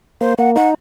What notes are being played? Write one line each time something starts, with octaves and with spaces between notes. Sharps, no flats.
A#3 C5
A#3 F#5
D#4 F#5